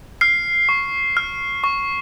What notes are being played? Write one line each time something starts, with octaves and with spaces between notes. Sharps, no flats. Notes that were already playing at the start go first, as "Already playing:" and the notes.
F6 C7
C#6
F6
C#6